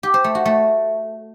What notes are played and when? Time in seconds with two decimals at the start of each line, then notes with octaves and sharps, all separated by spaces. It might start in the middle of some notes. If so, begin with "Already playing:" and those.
0.03 G4
0.14 C5
0.24 A3
0.35 F#4
0.45 A3